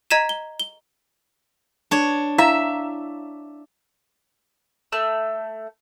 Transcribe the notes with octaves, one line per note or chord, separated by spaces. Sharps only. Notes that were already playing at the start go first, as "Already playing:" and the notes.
D#5 A#5 G#6 B6 D#7 E7
G7
G7
D4 C#5
E4 E5 F5 A#5
A3 E6